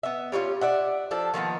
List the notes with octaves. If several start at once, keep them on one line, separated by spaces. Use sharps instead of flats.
B3 E5
G3 C#4 E4 F4
D5 E5 F#5
F3 D4 A4
D#3 F3 A#3 B3